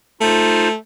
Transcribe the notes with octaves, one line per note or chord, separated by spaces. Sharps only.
A3 D#4 F4 C5